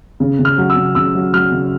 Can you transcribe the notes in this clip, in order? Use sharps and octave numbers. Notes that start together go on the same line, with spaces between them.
C#3
C#3
F6
F#3
E6
C#3
C#3 E6
F#3
F#3 F6
C#3